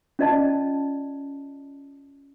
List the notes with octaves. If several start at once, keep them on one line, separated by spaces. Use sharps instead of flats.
C#4 F4 D5 D#5 A5